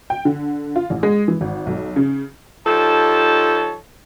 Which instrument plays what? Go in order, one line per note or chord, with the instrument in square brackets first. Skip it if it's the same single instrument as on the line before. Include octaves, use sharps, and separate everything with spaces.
[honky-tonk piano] G5
D3
F4
A1
G#3
E3
G#1
B1
C#3
[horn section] F3 D#4 G4 A4 C#5 A5